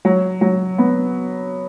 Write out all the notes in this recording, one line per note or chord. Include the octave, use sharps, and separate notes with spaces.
F#3
F#3
B3